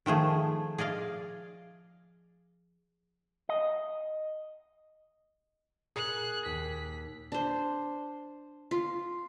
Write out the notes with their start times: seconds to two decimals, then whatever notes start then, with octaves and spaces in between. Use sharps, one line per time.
0.06 D#3 F3 A3 G#4
0.78 G#4 D5 D#5 F5
3.49 D#5
5.96 A#2 G#4 F#6
6.45 D#2 B6
7.32 D4 C5
8.71 F4